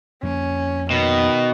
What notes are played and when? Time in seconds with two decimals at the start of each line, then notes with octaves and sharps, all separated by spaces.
0.23 F2 A#3 C#4
0.91 B2 D#3